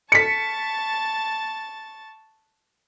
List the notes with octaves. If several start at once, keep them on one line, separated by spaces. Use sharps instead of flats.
A5 C#6 A6 B6 C#7